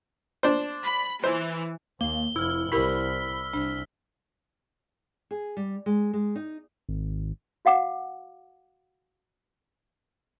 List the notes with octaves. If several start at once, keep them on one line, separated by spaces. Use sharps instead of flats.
D4 C5
B5
E3 C5
D#2 A#3 G7
F1 E4 E6 F6
C2 E4 G4 A#4 B5 E6 B6
C2 D4
G#4
G3
G#3
G#3
D#4
G#1
F#4 F5 F#5 D6